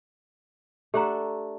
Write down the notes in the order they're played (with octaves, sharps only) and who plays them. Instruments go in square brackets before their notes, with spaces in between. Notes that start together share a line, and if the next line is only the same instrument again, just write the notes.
[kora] A3 D4 F#5 [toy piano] G4 A#5